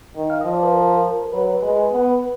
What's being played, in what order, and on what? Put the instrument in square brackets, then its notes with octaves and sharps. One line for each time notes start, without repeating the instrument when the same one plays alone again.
[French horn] D#3
[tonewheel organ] F5
[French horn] F3 [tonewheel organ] D#5
[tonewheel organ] D5
B4
A#4
[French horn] F#3 [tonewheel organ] B4
[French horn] G#3
B3